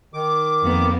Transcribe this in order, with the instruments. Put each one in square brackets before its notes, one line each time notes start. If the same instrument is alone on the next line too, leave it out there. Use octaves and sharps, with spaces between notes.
[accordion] D#3 D6
[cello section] F2 A#3 B3